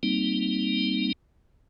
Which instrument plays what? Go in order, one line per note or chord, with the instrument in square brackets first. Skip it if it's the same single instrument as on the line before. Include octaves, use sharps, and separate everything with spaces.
[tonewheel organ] G3 A#3 C4 D#4